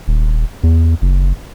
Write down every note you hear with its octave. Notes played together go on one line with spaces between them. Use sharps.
D#1
E2
F#1